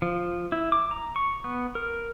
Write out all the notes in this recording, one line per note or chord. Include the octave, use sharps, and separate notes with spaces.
F3
E4
D6
A#5
C#6
B3
A#4